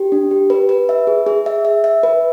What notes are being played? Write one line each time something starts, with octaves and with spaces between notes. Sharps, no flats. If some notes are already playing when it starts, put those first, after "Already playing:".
Already playing: G4
D4
G4
B4
B4
E5
G#4
G#4
E5
E5
E5
B4